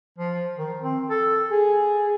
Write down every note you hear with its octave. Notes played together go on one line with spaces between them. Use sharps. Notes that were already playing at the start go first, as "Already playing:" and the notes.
F3
D#3
C4
A4
G#4